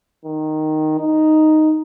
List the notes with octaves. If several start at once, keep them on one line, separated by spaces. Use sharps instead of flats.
D#3
D#4